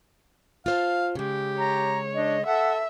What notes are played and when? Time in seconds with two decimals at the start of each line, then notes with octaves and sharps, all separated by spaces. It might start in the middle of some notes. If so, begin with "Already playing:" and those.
0.66 F4 C5 F5 A5
1.15 C#3 G#3 G4
1.58 C#5 A#5
2.14 D4 D#5
2.46 A4 E5 F#5